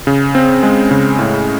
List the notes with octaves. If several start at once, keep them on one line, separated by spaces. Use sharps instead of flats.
C#3
C4
G#3
C#3
A2